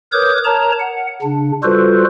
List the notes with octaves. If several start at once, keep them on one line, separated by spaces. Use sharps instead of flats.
A#4 B4 C#5 D6 D#6 G6
A#4 C#5 A5 A#5
F#5
C#3 D4
G3 F4 F#4 A4 B4 C5